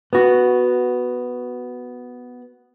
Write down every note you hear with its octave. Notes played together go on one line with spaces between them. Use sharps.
B3 F#4